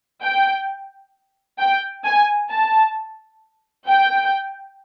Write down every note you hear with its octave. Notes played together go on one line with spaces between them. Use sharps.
G5
G5
G#5
A5
G5